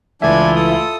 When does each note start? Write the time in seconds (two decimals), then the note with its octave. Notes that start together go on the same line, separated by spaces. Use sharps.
0.22 C#2 E3 A3 D4 E4 F4 E5 G#5
0.56 A4 D#6